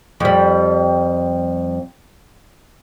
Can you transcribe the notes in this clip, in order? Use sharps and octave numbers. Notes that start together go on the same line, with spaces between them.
F2 G3